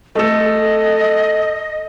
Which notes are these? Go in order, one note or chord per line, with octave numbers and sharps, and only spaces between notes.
A3 A4 D#5